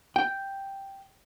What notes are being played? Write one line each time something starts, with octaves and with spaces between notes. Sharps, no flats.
G5